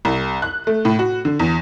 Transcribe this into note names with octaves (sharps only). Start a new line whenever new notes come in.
C2
F#6
A3
A2
F#4
D3
E2